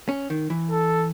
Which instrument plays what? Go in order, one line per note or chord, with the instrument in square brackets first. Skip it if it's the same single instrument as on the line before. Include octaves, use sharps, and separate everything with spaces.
[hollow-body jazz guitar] C#4
D#3
E3
[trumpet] A4